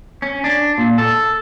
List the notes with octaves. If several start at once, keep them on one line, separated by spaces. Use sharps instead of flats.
C#4
D4
A#2
A4